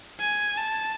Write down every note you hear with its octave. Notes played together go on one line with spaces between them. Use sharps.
G#5
A5